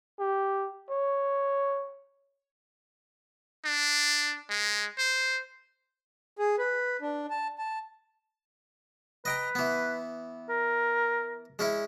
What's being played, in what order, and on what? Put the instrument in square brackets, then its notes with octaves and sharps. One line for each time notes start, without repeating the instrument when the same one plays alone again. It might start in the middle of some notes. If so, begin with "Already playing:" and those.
[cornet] G4
C#5
[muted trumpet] D4
G#3
C5
[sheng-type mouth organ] G#4
B4
D4
A5
A5
[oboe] B4 [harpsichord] D#5 G5 A#5
[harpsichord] E3 B3
[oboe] A#4
[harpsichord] G#3 C#4 E4